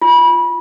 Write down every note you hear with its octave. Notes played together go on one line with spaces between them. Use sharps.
F4